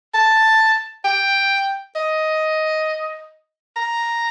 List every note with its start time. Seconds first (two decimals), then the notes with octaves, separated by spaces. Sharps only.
0.14 A5
1.05 G5
1.96 D#5
3.76 A#5